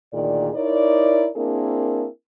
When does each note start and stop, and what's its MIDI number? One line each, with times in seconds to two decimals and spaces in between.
0.13 0.49 38
0.13 0.49 46
0.13 0.49 51
0.13 0.49 68
0.13 0.49 74
0.54 1.28 63
0.54 1.28 64
0.54 1.28 70
0.54 1.28 73
0.54 1.28 74
1.37 2.07 58
1.37 2.07 60
1.37 2.07 62
1.37 2.07 64
1.37 2.07 68
1.37 2.07 70